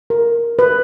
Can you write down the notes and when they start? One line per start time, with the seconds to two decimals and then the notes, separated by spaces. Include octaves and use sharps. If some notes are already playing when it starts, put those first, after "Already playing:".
0.10 A#4
0.59 B4